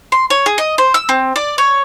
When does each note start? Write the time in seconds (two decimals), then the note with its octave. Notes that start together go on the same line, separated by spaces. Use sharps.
0.12 C6
0.30 C#5
0.46 G#4
0.58 D#5
0.78 C5
0.94 E6
1.09 C4
1.36 D5
1.58 C#5